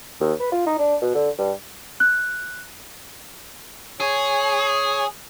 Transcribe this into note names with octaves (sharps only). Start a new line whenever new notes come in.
D#2
B4
F4
D#4
D4
B2
D3
G2
F#6
G#4 C#5